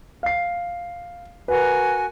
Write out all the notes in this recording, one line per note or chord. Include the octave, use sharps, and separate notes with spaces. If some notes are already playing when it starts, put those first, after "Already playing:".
F5 C7
F#4 A#4 B4 G#5